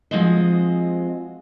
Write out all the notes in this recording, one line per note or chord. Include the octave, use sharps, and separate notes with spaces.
F3 G#3 C4 F#4 D#5